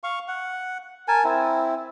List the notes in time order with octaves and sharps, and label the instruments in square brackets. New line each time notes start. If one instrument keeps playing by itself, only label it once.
[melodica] F5 C#6
F#5
A#4 G#5 A5
C4 E4